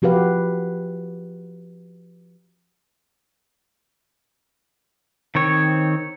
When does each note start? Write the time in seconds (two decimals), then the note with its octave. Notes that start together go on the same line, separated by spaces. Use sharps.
0.02 F3 F#4 G4 B4 F5
5.35 D#3 C4 C#5